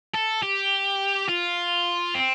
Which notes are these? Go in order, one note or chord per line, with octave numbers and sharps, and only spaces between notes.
A4
G4
F4
C4